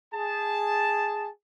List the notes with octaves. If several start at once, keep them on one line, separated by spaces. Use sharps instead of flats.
G#4 A5